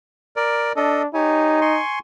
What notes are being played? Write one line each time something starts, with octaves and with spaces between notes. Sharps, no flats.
A#4 D5
D4 A4 D#5
D#4 G4 C#5 G#5
G#5 C6 C#6